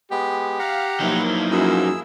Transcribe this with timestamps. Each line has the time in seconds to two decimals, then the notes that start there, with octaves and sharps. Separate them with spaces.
0.11 G#3 B3 G4
0.59 F5 F#5 A#5
1.00 F3 F#3 A#3 D#4 E4
1.51 F#2 G#4 E6